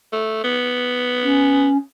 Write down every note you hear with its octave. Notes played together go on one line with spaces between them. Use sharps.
A3
B3
C#4